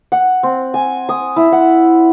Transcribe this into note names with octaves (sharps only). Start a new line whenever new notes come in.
F#5
C4
G#5
D#6
E4
F#5